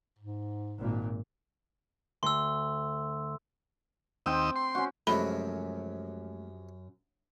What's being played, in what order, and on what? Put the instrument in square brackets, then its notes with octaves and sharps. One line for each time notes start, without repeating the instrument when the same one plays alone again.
[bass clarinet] G#2
[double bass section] G#1 A#2
[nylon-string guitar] D2 [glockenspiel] C6 E6
[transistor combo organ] D#2 D#5 E6 [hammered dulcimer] C4 G5
[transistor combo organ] C6
[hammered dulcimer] C#4 F#4
[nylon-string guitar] F#2 [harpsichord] C3 F3 F#3 [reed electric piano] G#3 A3 [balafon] B5